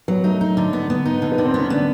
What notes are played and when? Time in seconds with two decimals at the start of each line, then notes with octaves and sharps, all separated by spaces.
0.08 F#3 B3
0.24 A3 D#4
0.41 D#4
0.57 D3
0.73 B3
0.90 B3
1.06 D#4
1.22 D3
1.32 B3
1.38 D3
1.46 C4
1.54 B3
1.60 C#4
1.70 B3 D4